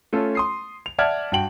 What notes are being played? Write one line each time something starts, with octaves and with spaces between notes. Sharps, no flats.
A3 C#4 F4 A4
C6 D#6 C7
F7
D5 E5 F#5 A5 F6 G#6
G2 F#4 G5 F#7